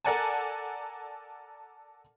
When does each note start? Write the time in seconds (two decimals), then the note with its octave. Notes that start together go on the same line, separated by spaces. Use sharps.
0.04 A4 A#4 D5 F#5 G#5 A5